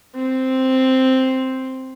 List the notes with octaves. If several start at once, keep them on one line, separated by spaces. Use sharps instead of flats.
C4